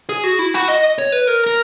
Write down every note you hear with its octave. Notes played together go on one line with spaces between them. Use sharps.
G#4
F#4
E4
F#4
D#5
C#5
B4
A#4
A#4